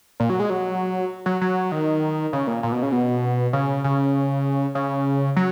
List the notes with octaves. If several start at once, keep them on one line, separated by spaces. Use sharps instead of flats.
A#2
F#3
G#3
F#3
F#3
F#3
D#3
C#3
A#2
A#2
B2
C#3
B2
C#3
C#3
C#3
F#3